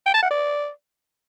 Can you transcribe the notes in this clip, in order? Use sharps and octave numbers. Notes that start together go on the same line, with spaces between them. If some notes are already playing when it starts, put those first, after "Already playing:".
G5
A5
F#5
D5